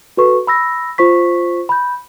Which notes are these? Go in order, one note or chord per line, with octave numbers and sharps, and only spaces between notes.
F#4 A4 B4 C#6
B5 E6 A#6
F4 C5 C#6 B6
B5 G6